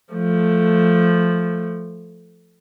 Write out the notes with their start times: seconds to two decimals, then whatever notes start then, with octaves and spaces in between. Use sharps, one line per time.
0.14 F3 A3